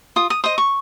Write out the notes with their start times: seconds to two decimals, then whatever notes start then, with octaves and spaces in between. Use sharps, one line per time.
0.16 F4 D#6
0.30 D#6
0.44 C5 D#5 D#6
0.58 C#6